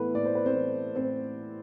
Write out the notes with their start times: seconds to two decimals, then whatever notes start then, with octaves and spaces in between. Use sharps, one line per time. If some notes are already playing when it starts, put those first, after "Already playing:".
Already playing: A2 E3 A3 B3 A4 B4
0.14 A2 D5
0.25 C5
0.35 B4
0.45 C4 C5
0.55 E3
0.95 A2 C4 C5